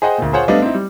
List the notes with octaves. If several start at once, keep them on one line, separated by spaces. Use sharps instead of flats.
G#4 C5 D#5 F#5 G5
D2 A#2
F4 G#4 C5 C#5 F#5
G3 A3 B3 D4 D#5 F5
C4 D#4 E4
G3